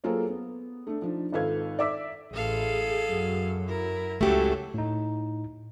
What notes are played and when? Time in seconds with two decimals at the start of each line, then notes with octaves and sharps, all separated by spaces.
0.04 F#3 A#3 F4 G#4 A4 C5
0.29 B3
0.87 A3 D4
1.02 F3 D4 D#4
1.33 G#1 F4 A4 B4 F5 G#6
1.79 D5 E5 D6 E6 B6
2.33 A1 G#4 A4 F5
3.08 F#2 F#3
3.68 E4 A#4
4.21 C#2 F#3 A3 C#4 E4 G4 A4
4.74 A2 D#4